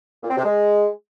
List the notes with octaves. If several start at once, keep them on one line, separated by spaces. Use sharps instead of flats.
A#2
C4
C3
G#3